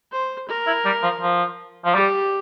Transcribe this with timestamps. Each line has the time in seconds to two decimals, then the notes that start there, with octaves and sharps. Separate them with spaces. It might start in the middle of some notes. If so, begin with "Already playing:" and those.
0.12 C5
0.49 A#4
0.67 E4
0.85 G3
1.03 F3
1.21 F3
1.85 F3
1.95 G3 G4